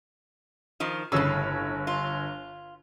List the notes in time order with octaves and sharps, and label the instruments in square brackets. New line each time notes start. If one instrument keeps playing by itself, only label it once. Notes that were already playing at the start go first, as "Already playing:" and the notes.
[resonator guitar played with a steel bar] D#3 F3
[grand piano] G1 C#5 E6 [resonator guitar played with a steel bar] A2 C#3
[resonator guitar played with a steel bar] F4